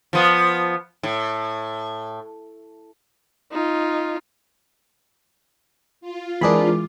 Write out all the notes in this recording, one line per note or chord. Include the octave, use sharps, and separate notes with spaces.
F3 B3
A2
D#4 F4
F4
E3 G#3 C4 D4 G#4 A#4 B5 D6